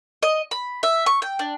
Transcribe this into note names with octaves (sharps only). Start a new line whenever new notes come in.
D#5
B5
E5
C#6
G5
D4